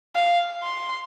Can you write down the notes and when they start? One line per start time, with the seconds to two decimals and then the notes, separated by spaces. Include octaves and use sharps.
0.16 F5
0.63 C6